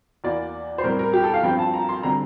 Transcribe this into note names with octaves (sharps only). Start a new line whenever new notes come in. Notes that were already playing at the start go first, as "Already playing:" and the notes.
E2 E3 A#3 D5
C5
A2 G3 C4 A#4
A#4
G4
A4
F5
G2 F3 C4 G5
A5
A#5
C6
D3 G3 C4 A#5